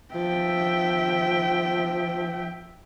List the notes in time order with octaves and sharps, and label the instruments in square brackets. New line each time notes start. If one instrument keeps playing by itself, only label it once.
[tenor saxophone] F3 [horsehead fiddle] E5 G5